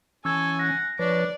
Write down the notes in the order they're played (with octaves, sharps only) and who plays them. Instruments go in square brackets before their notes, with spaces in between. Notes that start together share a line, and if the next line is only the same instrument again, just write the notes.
[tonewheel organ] E3 C#4 [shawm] A4 [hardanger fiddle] G#5 [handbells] C#6 E6 G#6
[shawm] F#5 [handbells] A#6
[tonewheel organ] F3 B4 C#5 [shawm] D4 [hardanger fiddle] D5